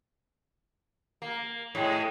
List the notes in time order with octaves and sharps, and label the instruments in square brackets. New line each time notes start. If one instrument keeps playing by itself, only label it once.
[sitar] A#3
A2 G#3